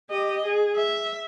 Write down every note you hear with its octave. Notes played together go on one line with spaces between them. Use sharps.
G4 D#5
G#4
E5